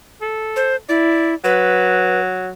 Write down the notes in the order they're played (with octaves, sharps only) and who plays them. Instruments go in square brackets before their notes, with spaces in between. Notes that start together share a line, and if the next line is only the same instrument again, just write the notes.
[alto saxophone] A4
[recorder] C5
[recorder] E4 [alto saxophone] D5
[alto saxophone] F#3 [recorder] B4